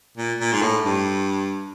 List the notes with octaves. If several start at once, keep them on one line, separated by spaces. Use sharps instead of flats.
A#2
A#2
G#2
A2
G2